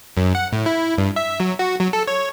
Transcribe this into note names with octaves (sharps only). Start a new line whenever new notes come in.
F#2
F#5
A2
E4
G2
E5
F#3
F#4
F#3
A4
C#5